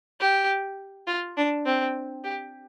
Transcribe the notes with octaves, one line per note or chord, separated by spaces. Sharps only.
G4
F4
D4
C4
G4